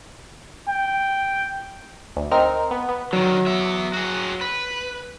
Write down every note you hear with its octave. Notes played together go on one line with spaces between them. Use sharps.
G5
D2
C4 D#4 A#4 F6
B3
B3
D3 D#3 F#3
B3 E5
F#4 G#4
B4